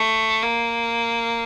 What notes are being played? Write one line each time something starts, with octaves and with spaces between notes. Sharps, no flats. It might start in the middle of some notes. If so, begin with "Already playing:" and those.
Already playing: A3
A#3